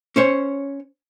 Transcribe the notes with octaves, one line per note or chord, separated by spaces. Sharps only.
C#4 C5 C#5